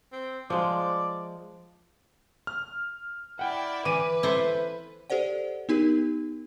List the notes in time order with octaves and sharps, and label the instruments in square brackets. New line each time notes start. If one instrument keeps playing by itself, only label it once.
[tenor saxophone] C4
[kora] F3 G#3 [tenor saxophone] D5
[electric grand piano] F6
[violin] E4 D5 [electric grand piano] F#5 G5
[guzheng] E3 [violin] B4 [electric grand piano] D6 D#7
[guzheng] E4 A4 C5
[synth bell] G4 A4 C5 D5 F#5
B3 D#4 G4 A#4